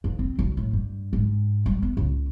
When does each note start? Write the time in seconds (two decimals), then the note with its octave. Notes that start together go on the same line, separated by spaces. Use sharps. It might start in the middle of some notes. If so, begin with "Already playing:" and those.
0.04 D#2
0.19 C4
0.39 B1
0.57 A2
0.73 G2
1.13 G#2
1.66 G3
1.83 B3
1.97 C#2